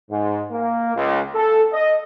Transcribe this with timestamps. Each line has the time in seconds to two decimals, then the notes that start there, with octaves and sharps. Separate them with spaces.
0.10 G#2
0.51 A#3
0.96 C#2
1.34 A4
1.73 D#5